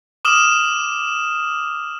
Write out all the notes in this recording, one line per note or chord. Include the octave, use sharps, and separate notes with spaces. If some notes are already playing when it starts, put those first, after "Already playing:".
D6 D#6 F6 E7 F#7